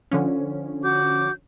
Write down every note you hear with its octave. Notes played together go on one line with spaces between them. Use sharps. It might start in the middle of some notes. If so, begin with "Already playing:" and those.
D3 F3 C#4
F#4 D6 G6